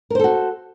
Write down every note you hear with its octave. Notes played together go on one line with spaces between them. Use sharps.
F#4 A4 A#4 C5